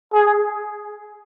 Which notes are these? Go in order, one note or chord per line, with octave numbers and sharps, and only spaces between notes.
G#4